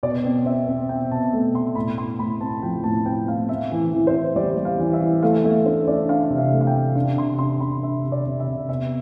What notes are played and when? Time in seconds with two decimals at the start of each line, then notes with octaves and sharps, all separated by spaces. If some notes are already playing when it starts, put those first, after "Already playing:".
0.03 B2 D5
0.24 C4
0.45 C4 E5
0.68 C4
0.89 B2 G5
1.11 B2 A5
1.33 A3
1.54 B2 C6
1.75 A2 B5
1.98 C4 C6
2.19 A2 B5
2.41 C4 A5
2.63 F3 G5
2.84 A2 A5
3.06 C4 G5
3.28 A2 F5
3.49 C4 E5
3.72 E3
3.93 E3
4.07 C5
4.14 E3
4.36 G3 D5
4.57 G3
4.65 F5
4.79 E3
4.93 E5
5.01 E3
5.23 A3 F5
5.44 A3 E5
5.66 D4 C5
5.87 D4 D5
6.09 D4 F5
6.30 C3
6.38 E5
6.53 A3
6.61 F5
6.67 G5
6.75 C3
6.96 D4
7.18 C3 C6
7.39 D4 C6
7.60 D4 B5
7.83 C3 E5
8.04 C3
8.12 D5
8.26 C3
8.40 E5
8.48 C3
8.69 B3 E5